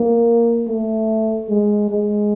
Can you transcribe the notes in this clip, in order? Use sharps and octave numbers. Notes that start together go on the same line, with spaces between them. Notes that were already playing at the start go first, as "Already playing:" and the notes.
Already playing: A#3
A3
G#3
G#3